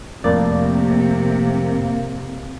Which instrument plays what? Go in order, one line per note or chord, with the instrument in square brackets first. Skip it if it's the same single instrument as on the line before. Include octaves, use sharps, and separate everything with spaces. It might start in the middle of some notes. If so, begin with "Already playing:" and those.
[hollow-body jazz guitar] F2 A2 D5 [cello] C3 [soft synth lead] A#3